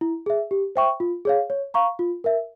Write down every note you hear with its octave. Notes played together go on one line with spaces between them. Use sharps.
E4
G#4 E5
G4
C5 E5 G5 C#6
F4
G#4 C#5 F5
C#5
F5 A#5 C#6
F4
A#4 E5